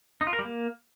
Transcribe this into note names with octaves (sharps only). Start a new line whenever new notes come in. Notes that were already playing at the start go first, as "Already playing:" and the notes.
D#4
F4
A#4
G3
A#3